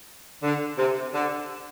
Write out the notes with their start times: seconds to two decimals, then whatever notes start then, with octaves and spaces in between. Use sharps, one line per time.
0.43 D3
0.77 C3
1.13 D3